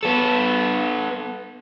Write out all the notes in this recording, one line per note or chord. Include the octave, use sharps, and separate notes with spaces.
B3 A4